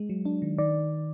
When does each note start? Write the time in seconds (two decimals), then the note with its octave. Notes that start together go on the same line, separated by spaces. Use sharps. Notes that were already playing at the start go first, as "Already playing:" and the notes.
Already playing: G#3
0.09 F#3
0.25 D4
0.42 D#3
0.58 D#3 D5